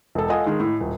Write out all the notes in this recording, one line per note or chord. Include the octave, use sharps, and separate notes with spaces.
E1 A4
F4 A4 D#5 F#5 G#5 D#6
D#3 G#3
A2
D#1